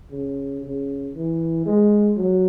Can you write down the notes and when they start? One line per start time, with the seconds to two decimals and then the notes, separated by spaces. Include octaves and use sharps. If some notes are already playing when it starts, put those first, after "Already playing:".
0.12 C#3
0.62 C#3
1.14 E3
1.66 G#3
2.17 F#3